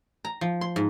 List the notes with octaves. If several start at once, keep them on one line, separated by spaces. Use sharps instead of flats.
A#5
F3
C6
G#2